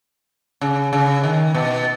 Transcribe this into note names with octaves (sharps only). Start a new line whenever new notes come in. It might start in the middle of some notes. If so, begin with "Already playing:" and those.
C#3
C#3
D#3
B2